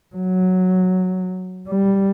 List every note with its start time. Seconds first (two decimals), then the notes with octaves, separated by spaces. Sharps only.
0.16 F#3
1.69 G3